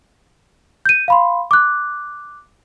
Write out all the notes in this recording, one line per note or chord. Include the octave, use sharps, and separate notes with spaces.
G6 D#7
F5 B5 C6
D6 F#6